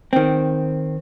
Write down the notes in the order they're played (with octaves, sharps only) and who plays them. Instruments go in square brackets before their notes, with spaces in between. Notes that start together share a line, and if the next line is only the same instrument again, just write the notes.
[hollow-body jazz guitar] D#3 C4